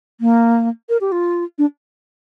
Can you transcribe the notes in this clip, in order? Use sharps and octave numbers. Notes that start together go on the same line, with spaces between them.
A#3
A#4
G4
F4
D4